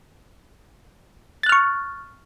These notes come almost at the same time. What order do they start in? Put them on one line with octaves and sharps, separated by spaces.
A6 F#6 F6 C#6